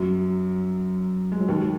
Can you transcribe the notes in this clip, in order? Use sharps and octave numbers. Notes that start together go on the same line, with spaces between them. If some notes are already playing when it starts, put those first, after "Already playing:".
Already playing: F#2 F#3
G#3
F#3
D#2 D#3